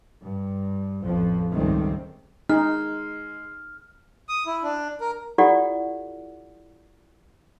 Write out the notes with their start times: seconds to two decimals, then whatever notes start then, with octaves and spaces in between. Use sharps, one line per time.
0.21 G2
1.01 A1 F2 F3
1.51 C#2 G2 D#3 G#3 A3 C4
2.50 G#3 D#4 F6
4.28 D#6
4.47 E4
4.63 D4
5.01 A#4
5.38 E4 F4 G4 A4 D5 F#5